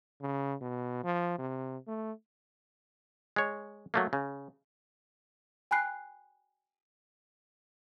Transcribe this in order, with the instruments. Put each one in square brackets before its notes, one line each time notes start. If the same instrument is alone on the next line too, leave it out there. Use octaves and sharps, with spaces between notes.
[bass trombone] C#3
B2
F3
C3
A3
[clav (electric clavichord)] G#3 C#5
F#3 A3 A#3
C#3
[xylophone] G5 G#5 B5 F#6 C7